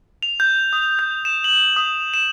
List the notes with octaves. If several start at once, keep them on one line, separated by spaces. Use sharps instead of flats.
F7
G6
D#6
G6
E7
F#7
D#6
E7